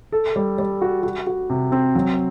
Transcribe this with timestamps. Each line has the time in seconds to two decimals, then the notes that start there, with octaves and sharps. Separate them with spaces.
0.12 A4
0.36 G3
0.58 G3
0.82 F#4
1.03 F#4
1.27 F#4
1.50 C3
1.72 C4
1.95 F#3